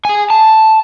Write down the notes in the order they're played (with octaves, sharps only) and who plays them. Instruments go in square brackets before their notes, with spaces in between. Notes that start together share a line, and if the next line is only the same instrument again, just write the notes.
[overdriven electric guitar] G#4 G#5
A5